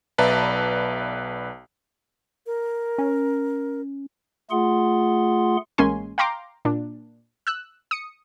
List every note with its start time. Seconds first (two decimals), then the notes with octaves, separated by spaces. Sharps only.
0.18 B1 B4 D5 E5 A5 A#5
2.46 A#4
2.98 C#4
4.51 A3 F4 G#4 F#5 C6
5.78 A1 G#3 A#3 C#4 G#5 C6
6.18 F5 G5 A#5 C6 D6
6.65 A#2 D4
7.47 E6 F#6
7.91 D#6 C#7